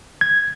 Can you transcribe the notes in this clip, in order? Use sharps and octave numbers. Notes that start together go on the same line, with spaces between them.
G#6